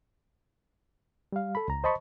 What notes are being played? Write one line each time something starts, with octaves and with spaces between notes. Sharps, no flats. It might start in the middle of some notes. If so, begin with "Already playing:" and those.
G3 F5
A4 B5
C#2 A#5
C5 D#5 A5 B5 C#6